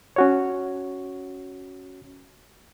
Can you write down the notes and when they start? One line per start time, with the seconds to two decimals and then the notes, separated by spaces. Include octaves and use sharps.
0.16 C#4 F#4 C#5